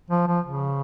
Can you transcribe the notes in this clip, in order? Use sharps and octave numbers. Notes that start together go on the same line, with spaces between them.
F3
F3
C#3